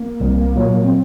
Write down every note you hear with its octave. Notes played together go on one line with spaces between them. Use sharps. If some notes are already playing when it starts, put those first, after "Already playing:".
Already playing: A#3
C2
A#2 F#3
C4